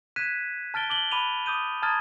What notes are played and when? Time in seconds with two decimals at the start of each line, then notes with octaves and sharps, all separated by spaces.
0.16 F#6 G#6 B6 D#7 E7
0.74 A5 F6 A6 D7 G7
0.90 D6 F#7 G7
1.11 B5 D6 F#6 D#7 F7
1.46 D6 D#6 G6 D#7
1.83 A5 A#5 D#6 F6 G#6 A6